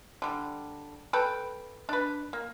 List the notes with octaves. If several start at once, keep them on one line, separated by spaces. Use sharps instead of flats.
D3 G3
A4 B4 G5
D4 B4
A#3